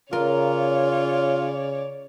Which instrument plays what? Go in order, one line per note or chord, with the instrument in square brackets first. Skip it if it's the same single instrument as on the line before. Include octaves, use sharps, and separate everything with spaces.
[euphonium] C#3 [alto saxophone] F4 [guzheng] A#4 [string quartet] C#5 D5